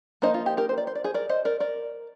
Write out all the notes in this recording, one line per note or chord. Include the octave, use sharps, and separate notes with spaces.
F3 A#3 D#4 C5 D#5
F4
G4
G4 A#4
C5
D5
C5
D5
G#4 C5
A#4 D5
C5 D#5
A#4 D5
A#4 D5